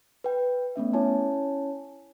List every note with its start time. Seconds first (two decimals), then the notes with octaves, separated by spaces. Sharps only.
0.24 B4 G5
0.76 A3 B3 C#4 E5
0.93 C#4 E4 C#5 G#5 A5